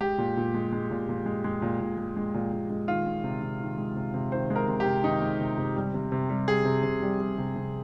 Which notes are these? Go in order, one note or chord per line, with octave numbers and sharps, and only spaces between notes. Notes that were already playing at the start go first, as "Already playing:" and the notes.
G#3 G4
A#2
A#2
G#3
G#3
A#2
A#2
G#3
G#3
A#2
A#2
G#3
G#3
A#2
A#2
G#3
D#3 F4
G#3
C3
C3
D#3
G#3
C3
C3
D#3 C5
G#3
A#4
C3
G4
C3
D#3 D#4
G#3
C3
C3
G3
C3
C3
G3
G3 G#4
C3
C3
G3
G3
C3
C3